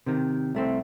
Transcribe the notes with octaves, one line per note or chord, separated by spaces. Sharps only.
C3 D#3
C2 A3 C4